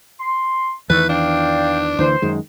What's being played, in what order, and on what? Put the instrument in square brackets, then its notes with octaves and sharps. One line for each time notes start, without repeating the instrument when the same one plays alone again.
[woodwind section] C6
[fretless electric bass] E2 D#3 E3 [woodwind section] A3 [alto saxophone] B4
[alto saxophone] D4 [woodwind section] D5 F5 G5
[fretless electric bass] D2 D3 E3 [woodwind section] C5
[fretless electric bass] F#2 D#3 G#3